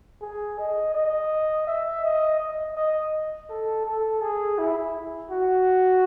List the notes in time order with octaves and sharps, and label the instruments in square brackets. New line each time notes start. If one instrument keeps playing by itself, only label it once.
[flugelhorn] G#4
D#5
D#5
E5
D#5
D#5
D#5
A4
A4
G#4
E4
F#4